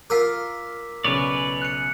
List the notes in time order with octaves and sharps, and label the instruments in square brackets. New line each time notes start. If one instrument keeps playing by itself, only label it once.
[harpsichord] F4 A#4 [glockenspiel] D6 E6 B6
[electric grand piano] B1 C#3 [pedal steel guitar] B4 C#5 D5
[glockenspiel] F#6 C#7